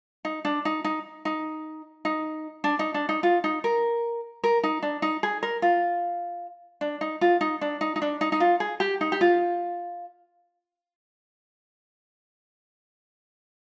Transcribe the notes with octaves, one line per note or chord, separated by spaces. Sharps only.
D#4
D4
D#4
D#4
D#4
D#4
D4
D#4
D4
D#4
F4
D#4
A#4
A#4
D#4
D4
D#4
G#4
A#4
F4
D4
D#4
F4
D#4
D4
D#4
D#4
D4
D#4
D#4
F4
G#4
G4
D#4
G4
F4